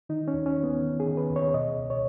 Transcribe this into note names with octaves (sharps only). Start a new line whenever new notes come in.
D#3 D#4
C#4
D#2
C#4
D#2
B3
D#3
G#4
D#3
B4
D#2
C#5
B2 D#5
C#2
C#5